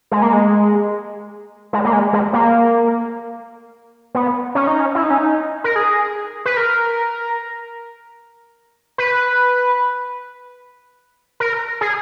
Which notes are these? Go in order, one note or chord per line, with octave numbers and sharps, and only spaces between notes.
G#3
A#3
G#3
G#3
A#3
G#3
G#3
A#3
B3
C#4
D#4
C#4
E4
D#4
C#4
D#4
A#4
G#4
B4
A#4
B4
A#4
G#4